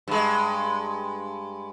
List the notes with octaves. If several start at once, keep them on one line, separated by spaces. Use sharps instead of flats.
G2 G#3